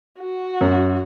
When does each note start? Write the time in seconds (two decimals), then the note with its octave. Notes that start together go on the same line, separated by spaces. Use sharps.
0.19 F#4
0.61 F#2